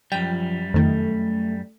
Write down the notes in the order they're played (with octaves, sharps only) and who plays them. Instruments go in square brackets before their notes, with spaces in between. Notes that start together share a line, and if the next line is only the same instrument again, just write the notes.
[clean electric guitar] F#2 G3 [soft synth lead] F3 [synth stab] G5
[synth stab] F2 D#3 [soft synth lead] A3